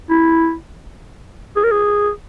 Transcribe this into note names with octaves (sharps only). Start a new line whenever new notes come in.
E4
G#4
A#4
G#4